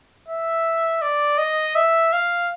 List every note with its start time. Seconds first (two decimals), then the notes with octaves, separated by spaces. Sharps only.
0.29 E5
1.02 D5
1.38 D#5
1.75 E5
2.13 F5